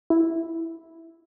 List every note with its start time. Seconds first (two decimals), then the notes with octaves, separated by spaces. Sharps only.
0.10 E4